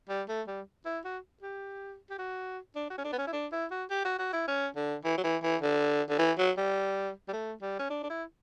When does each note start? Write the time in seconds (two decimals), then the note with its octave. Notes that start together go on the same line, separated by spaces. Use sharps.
0.09 G3
0.29 A3
0.47 G3
0.86 E4
1.04 F#4
1.42 G4
2.10 G4
2.19 F#4
2.75 D4
2.90 F#4
2.98 C#4
3.04 D4
3.13 B3
3.18 C#4
3.27 E4
3.33 D4
3.52 E4
3.71 F#4
3.90 G4
4.05 F#4
4.19 F#4
4.33 E4
4.47 C#4
4.76 D3
5.04 E3
5.18 F#3
5.23 E3
5.43 E3
5.62 D3
6.09 D3
6.18 E3
6.38 F#3
6.57 G3
7.28 G3
7.33 A3
7.62 G3
7.79 C#4
7.90 D4
8.03 D4
8.10 E4